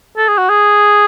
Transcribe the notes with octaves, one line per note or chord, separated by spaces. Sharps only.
A4
G#4
F#4
G#4